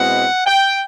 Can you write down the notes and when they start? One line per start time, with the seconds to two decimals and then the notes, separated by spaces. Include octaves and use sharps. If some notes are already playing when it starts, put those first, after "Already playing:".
Already playing: B2 G#3 C4 E4 F#5
0.46 G5